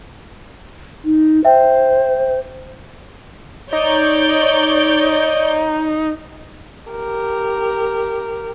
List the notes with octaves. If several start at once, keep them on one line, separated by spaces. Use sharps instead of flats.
D#4
C5 E5 G5
D#4 C#5 D5 G6
G4 A#4